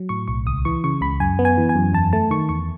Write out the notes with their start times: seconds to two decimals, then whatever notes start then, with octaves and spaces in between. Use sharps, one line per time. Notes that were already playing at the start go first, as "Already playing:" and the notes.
Already playing: F#3
0.09 A2 C#6
0.28 B1 C#6
0.46 C#2 D#6
0.65 E3 C#6
0.84 C#3 C#6
1.01 C#2 B5
1.20 F#2 G#5
1.39 B3
1.45 G#5
1.58 E3
1.69 G#5
1.76 F#2
1.93 E2 A5
2.13 A3 A5
2.31 D#3 C#6
2.49 E2 C#6